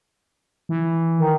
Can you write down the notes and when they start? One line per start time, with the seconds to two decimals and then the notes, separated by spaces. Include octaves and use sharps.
0.69 E3
1.18 D#3